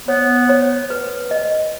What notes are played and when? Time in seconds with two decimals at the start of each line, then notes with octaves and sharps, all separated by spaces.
0.08 B3 C#5
0.49 C#5
0.90 B4
1.31 D#5